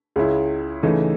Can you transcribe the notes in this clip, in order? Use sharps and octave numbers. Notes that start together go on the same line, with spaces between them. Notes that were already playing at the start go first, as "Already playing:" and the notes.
C#2 C#3 G#3 C#4 E4
C#3 E3 A3 D#4